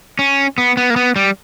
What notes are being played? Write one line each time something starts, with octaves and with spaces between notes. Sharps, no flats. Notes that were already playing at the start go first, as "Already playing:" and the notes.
C#4
B3
B3
A#3
B3
G3